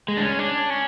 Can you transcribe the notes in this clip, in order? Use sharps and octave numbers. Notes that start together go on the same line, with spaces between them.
G#3
D4
C#4
D4
C#4